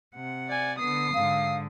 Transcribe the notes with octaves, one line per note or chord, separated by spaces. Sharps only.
C3 F#5
D5 G#5
D3 B3 D#6 C7
G#2 D3 F5